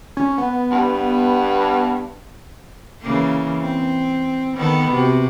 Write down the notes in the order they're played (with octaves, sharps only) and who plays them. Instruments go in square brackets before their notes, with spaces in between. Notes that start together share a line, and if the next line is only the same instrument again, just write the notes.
[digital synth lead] C#4
B3
[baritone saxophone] G2
[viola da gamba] C#3 E3 A#3
C4
D#3 B3 A4
C3 F#4